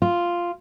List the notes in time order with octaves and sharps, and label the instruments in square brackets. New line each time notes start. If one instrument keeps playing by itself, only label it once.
[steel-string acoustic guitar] F4